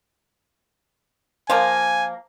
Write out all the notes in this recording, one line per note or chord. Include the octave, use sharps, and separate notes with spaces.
F3 A#3 G#5